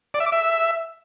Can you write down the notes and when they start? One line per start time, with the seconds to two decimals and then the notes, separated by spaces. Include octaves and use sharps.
0.14 D5
0.20 E5
0.26 D6
0.32 E5